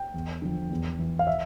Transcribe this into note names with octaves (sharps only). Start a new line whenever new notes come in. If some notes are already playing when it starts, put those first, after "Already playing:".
Already playing: G5
E2
D3 F3
E2
E3
F5
E5